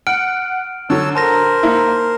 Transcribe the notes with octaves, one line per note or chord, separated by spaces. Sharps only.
F#5 F6 D7
D3 F#3 C#5 A5 E6
A#4 C5 A5 A#5 A#6
A#3 D#4 E4
A#3